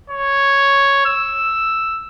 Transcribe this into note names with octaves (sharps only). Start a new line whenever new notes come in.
C#5
E6